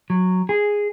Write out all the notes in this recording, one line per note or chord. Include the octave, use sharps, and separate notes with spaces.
F#3
G#4